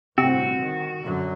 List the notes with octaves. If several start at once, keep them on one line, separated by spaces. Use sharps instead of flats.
G1 A2 C3 C4 F#4
D#3
F#2 D3 F#3